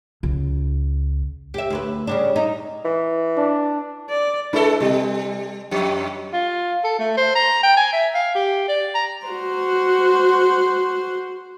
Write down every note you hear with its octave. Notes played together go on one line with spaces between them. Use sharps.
C#2
G4 E5
D2 E4 B4
C#3 G3 D4
D#4
E3
D4
D5
G#3 D4 E4 A4 B4
C3 G3
F2 G4
F4
A4
A3
C5
A#5
G5
G#5
E5
F5
G4
D5
A#5
F#4 C5